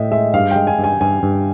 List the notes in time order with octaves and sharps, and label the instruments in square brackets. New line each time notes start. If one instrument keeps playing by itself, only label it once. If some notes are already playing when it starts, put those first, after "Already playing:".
Already playing: [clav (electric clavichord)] A2 [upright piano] D#5 E5 G5
[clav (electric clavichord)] G#3 [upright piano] E5
[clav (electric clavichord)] G2 [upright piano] F5
[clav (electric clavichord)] G#3 [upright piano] G5
[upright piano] G#5
[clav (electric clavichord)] G2
[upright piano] G#5
[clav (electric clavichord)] G2 [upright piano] G#5
[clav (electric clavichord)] G2